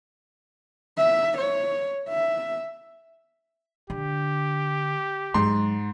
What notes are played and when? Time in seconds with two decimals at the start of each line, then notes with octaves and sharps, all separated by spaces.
0.97 E5
1.38 C#5
2.09 E5
3.90 D3 G4
5.34 G#2 F#3 G#3 C6